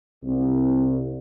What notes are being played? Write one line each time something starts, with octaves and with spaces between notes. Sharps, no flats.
C2